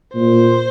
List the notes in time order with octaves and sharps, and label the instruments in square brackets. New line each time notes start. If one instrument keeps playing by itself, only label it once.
[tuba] A#2 [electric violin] C5